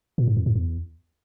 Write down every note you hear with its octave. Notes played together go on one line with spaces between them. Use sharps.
A#2
G#2
F2
G#2
E2